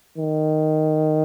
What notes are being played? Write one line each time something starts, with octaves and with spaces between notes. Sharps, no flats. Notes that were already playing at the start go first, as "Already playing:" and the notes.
D#3